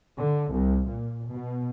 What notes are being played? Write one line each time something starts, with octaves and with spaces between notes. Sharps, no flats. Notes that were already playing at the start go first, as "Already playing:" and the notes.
D3
C2
A#2
B2